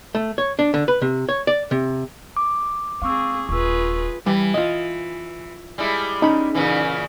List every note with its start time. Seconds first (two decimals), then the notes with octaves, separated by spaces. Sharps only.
0.15 A3
0.38 C#5
0.59 D4
0.74 D3
0.88 B4
1.02 C3
1.29 C#5
1.47 D5
1.71 C3
2.37 D6
3.02 G#3 C4 G#4 F5 C#6 E6
3.49 D#1 F4 G#4 B4 C#6 E6
4.26 E3 G3
4.54 F4 D#5
5.78 G3 G#3 E4
6.22 C#4 D#4 B5
6.55 A#2 C#3 E3